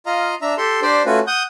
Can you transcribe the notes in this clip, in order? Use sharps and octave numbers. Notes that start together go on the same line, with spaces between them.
F4 D#5 F5 A#5
D4 E5 A#5
G4 A4 C6
D4 G4 C5 D5
A3 C#4 F4 F#4 B4
F#5 D#6 G6